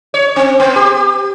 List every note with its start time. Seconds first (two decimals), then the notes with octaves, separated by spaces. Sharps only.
0.14 C#5
0.36 C4
0.60 B3
0.76 G4